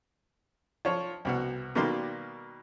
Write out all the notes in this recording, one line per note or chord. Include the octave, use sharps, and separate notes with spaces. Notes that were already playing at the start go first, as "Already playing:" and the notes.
F3 C#5
C2 B2 F#4
B2 D#3 G3 A#3 D5 C6